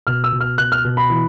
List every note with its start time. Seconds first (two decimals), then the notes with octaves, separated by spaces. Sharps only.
0.07 B2 F6
0.24 E6
0.32 B2
0.40 F6
0.58 B2 F#6
0.72 F6
0.84 B2
0.97 B5
1.10 E3